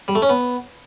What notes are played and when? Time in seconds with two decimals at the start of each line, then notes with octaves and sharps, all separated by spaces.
0.08 G3
0.15 A3
0.22 C#4
0.29 B3